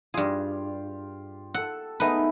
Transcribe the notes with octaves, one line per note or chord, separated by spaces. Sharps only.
G2 F4 G4 G#4
A4 F#5 E6
G#3 A3 B3 D#4 B4